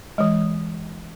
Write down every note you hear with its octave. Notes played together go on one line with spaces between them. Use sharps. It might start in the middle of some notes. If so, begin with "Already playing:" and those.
E3 G#3